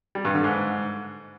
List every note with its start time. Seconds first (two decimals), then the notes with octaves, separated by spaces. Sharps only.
0.15 G3
0.25 G2
0.34 D3
0.44 G#2